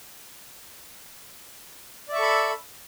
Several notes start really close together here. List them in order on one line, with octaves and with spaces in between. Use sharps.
D5 E5 C#6 A4 B5